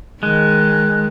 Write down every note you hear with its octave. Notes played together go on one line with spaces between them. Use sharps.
D#3 G#3 F#6